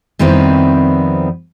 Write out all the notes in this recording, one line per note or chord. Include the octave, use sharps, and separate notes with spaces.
F2 D#3 G3 B3 C4 E4